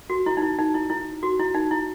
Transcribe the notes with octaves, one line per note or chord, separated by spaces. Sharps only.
F#4
E4
D#4
E4
D#4
E4
E4
F#4
E4
D#4
E4